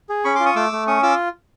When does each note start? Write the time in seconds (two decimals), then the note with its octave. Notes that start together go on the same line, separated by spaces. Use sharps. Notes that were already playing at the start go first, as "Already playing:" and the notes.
0.09 G#4
0.25 C#4 B5 C#6
0.35 C6 D6
0.40 F4
0.45 C#6 D#6
0.56 A3 D6 E6
0.72 A3
0.87 C#4 C#6 D#6
1.03 F4 D6 E6